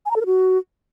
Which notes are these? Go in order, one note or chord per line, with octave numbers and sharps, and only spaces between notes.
G#5
A#5
A4
A#4
F#4